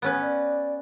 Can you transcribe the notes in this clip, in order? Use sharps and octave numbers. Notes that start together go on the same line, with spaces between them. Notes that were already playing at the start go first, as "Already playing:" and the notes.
B3 C#4 B4
D5